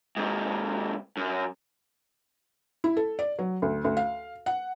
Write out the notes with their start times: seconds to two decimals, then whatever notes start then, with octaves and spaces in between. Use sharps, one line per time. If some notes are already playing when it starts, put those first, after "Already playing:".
0.17 G#2 C3
1.17 F#2
2.84 E4
2.97 A4
3.19 D5
3.39 F#3
3.62 D2
3.84 D2
3.97 F5
4.46 F#5